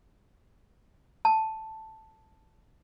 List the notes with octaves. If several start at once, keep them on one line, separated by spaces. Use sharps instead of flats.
A5